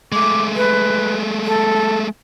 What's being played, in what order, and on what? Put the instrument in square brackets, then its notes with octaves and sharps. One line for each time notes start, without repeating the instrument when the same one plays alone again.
[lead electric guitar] G#3 A3 [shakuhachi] D6
[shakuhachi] B4
A4